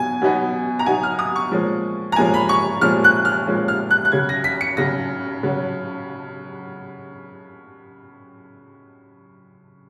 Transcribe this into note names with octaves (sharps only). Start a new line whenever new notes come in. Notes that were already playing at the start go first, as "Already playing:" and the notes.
Already playing: B2 F#3 B3 G#5
B2 F#3 B3 D#4
A#5
B2 F#3 B3 D#4 G#5
F6
D#6
C#6
A#2 F3 G#3 C#4
A#5
A#2 F3 G#3 C#4 G#5
B5
C#6
A#2 F3 G#3 C#4 F6
F#6
F6
A#2 F3 G#3 C#4
F6
F#6
F#6
C#3 F#3 C#4 G#6
A#6
B6
C#7
C#3 F#3 C#4 A#6
C#3 F#3 C#4